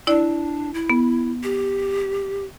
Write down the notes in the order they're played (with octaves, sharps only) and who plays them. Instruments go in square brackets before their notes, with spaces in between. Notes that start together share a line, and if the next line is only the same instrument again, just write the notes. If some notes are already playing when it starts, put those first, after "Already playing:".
[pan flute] D4 [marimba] E4 D5
[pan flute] E4
[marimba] B3
[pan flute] G4